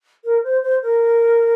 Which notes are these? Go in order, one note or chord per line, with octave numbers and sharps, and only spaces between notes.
A#4
C5
C5
A#4